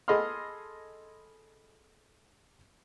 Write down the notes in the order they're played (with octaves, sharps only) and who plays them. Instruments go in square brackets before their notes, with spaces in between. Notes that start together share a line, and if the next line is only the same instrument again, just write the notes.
[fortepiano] G#4 A4 D#5 B5 C6 F6